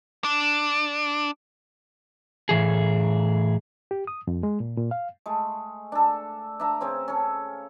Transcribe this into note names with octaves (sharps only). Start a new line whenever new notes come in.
D4
A2 E3 G#4
G4
D#6
F2
G#3
A#2
A#2
F5
G#3 A3
D4 A4
D4 E5 A#5
C#3 C4 C#4
C#4 A4